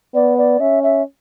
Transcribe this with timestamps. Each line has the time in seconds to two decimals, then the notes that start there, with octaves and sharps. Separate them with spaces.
0.14 B3 D5
0.38 D5
0.60 C#4 E5
0.83 E5